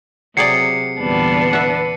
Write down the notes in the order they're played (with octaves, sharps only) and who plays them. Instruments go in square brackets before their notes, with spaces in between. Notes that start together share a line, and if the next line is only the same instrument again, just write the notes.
[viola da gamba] C3 [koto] F#3 G#4 D5 [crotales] C7 C#7
[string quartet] E2 B3 D4 [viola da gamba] A#2 D3 G3
[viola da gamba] B4 [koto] E5 F#5